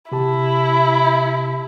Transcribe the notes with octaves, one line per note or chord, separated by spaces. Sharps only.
C3 E4 G4 A5